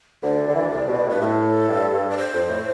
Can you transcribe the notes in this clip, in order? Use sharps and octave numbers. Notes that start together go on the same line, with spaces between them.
D2 D3 D5
D3
E3
D2 D3
C2 C3
B2
A2
G2 B4
A2 A4 B4
G2
G2
D5
C5
F2
A2